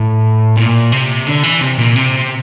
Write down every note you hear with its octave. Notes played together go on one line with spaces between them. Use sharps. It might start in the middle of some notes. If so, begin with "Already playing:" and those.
Already playing: A2
A#2
C3
D3
E3
C3
A#2
C3